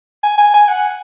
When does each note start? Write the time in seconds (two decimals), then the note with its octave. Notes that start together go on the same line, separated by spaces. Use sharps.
0.23 G#5
0.38 G#5
0.54 G#5
0.68 F#5